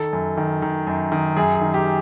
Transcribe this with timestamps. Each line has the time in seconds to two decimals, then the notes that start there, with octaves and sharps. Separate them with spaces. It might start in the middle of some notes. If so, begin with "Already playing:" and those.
Already playing: D#3 A4
0.13 F#2
0.37 D#3
0.62 D#3
0.87 F#2
1.12 D#3
1.37 F#2 G#4
1.55 G#4
1.61 D#3
1.74 G4